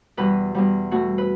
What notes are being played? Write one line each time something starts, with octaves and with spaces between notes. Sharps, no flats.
E2 B2 G3 B4
E2 B2 G3
B2 A3 C4 F#4
B4